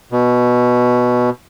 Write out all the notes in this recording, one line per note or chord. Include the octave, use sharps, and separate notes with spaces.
B2